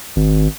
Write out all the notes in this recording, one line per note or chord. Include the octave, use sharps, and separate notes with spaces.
G#1